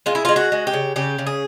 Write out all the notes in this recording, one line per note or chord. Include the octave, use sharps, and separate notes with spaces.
G#3 F4
E4
G#3 F4
F#4
G#3
G4
C#3
C#3 G4
C#3
G#4